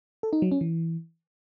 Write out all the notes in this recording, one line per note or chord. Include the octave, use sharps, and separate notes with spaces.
A4
D#4
F#3
C#4
E3